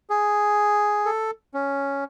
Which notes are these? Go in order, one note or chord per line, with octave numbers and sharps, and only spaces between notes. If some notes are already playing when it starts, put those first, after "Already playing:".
G#4
A4
C#4